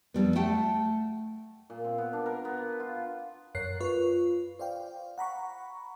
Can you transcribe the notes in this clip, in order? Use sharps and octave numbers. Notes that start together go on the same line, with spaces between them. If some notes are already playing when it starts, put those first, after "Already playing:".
F2 G3 B3
A3 F#5 G5 A5
A#2
C4
B3
D4
A#4
B3
F4
F#2 A#4 C#5 F#6 C7
F4 B4 C#6
C5 D5 F5 G5
F#5 A#5 B5 C#6